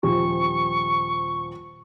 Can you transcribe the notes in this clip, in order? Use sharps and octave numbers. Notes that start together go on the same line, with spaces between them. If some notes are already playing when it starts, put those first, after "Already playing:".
D#1 F3 C#6